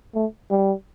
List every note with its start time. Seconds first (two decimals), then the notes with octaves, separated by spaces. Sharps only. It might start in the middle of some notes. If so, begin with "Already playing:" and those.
0.15 A3
0.51 G3